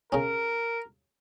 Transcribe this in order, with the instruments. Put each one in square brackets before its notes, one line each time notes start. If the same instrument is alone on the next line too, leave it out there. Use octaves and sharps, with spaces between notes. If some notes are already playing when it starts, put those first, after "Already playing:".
[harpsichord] C#3 C#4 [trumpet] A#4